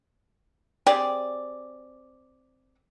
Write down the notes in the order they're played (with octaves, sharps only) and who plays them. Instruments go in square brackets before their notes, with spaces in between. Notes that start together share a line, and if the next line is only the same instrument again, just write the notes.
[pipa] C4 G4 G#4 D5